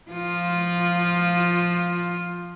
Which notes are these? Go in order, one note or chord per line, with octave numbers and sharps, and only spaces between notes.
F3 F4